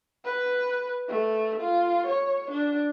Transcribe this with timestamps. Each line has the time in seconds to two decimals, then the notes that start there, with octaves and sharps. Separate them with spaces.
0.25 B4
1.08 A3
1.61 F4
2.07 C#5
2.51 D4